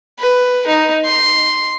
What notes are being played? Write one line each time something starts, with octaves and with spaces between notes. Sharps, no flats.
B4
D#4
C6